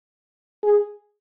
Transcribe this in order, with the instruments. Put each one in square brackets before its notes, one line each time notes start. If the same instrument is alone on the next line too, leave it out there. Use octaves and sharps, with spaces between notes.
[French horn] G#4